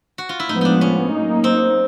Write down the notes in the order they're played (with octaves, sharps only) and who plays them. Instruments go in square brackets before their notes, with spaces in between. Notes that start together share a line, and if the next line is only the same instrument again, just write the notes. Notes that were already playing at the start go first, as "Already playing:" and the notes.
[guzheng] F#4
F4
E4
[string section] A2 F3 G#3 B3 [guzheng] D#4
[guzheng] D4 D#4
C#4
[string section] F#3 A#3 D#4
[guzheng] C4